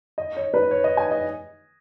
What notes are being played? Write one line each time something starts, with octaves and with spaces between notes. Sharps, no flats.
D#5
C#5
B4
C#5
D#5
G#5
D#5